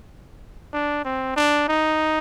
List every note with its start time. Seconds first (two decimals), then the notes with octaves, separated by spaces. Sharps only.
0.73 D4
1.05 C4
1.36 D4
1.69 D#4